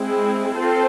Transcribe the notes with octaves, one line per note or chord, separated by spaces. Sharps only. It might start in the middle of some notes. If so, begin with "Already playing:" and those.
Already playing: G#3 C4 E4 G#4
C4 F4 A4 C5